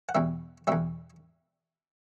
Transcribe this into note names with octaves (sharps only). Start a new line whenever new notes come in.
F#5
E2 B2 G3 E5
E2 B2 G3 E5